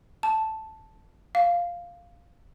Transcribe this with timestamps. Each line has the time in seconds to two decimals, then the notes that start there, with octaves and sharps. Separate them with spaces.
0.23 A5
1.35 F5